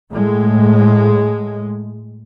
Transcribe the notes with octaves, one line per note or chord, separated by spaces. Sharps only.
A2 G#3